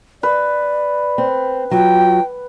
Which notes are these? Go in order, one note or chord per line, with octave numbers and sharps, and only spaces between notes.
B4 D5
C4
F#3 F4 G5